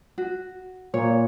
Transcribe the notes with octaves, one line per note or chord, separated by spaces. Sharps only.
F#4
A#2 C#5